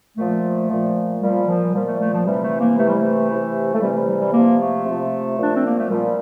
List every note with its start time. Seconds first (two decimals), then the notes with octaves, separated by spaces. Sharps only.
0.17 A#2 F3 A3
0.70 A#2 F3
1.21 A#2 F3 G3
1.48 F3
1.74 A#2 F3 G3
1.87 A3
2.00 A3
2.13 F3
2.25 C3 E3 G3
2.43 A3
2.60 A#3
2.78 C3 E3 A3
2.88 G3
2.97 A3
3.29 C3 E3
3.74 A3
3.81 C3 E3 G3
3.95 G3
4.08 G3
4.21 G3
4.34 C3 F3 A#3
4.59 A3
4.85 C3
4.90 F3
5.37 A#2 F3
5.43 D4
5.55 C4
5.66 A#3
5.78 A3
5.90 A#2 F3 G3